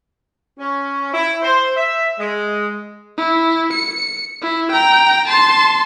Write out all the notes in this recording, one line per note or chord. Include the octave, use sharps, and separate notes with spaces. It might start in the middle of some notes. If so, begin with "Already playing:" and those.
C#4
E4
C5
E5
G#3
E4
C#7
E4
G5 A#5
A5 C6